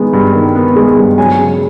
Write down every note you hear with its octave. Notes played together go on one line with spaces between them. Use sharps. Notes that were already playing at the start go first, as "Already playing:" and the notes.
Already playing: D#3 G#3 B3
G2
D#3
B3
G#3
G2
F#3 G#5
C#3